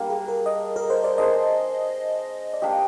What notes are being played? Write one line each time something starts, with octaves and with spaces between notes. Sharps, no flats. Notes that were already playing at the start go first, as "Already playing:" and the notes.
Already playing: G3 A#3 D4 A#4
G#4
A#4
D#5
A#4
C5
D5
D4 G#4 C5 D#5
D5
A#3 D4 G4 D#5